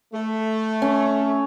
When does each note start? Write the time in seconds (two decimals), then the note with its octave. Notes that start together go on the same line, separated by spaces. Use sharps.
0.13 A3
0.82 C#4